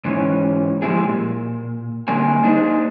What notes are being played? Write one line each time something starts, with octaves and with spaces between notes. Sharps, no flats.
G#2 E3 C#4
F3 G3 G#3 C4 E4 G#4
A#2
D3 G3 A#3 C4 G#5
A#3 D4 D#4 G#4 C5